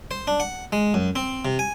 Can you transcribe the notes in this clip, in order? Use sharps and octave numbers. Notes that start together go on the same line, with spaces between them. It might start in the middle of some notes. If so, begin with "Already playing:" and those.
C5
D4
F#5
G#3
F#2
C4
C3
G#5